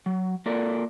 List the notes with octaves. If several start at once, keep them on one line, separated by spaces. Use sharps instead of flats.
F#3
A#3 F4 A4 A#4 D5